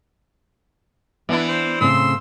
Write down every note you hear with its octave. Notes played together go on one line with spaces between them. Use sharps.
E3 B3 D4 E4
C5
A2 C#3 C4 C6 E6